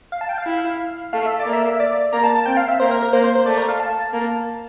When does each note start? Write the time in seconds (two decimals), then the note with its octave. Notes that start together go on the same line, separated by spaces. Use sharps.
0.12 F5
0.21 A5
0.29 G5
0.38 F5
0.46 E4
1.13 A3 F5
1.26 E5
1.39 D5
1.46 A#3
1.53 E5
1.80 D5
2.13 A#3 A#5
2.24 A5
2.36 A5
2.46 C4 G5
2.57 F5
2.68 E5
2.80 A#3 C5
2.91 A#4
3.03 A#4
3.13 A#3 C5
3.24 C5
3.35 C5
3.46 A3 D5
3.58 A#4
3.69 F5
3.80 A5
4.13 A#3